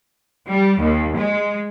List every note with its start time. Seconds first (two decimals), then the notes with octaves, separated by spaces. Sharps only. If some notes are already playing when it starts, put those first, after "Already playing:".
0.50 G3
0.80 D#2
1.16 G#3